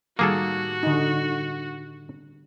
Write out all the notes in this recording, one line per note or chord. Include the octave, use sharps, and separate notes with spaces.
A2 D#3 G3 A#3 F#4 G#4 A4
D3 D#4